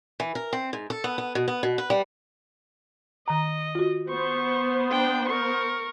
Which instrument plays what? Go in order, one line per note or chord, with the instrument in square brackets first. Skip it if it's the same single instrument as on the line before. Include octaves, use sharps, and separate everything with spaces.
[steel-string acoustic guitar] E3
A#4
C4
G#2
A4
B3
B3
B2
B3
B2
B4
G3
[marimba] D#3 A#5 [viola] D#5
[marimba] F4 F#4
[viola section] B3 C5 [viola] C#6
[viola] D4 G5
A#4 C#6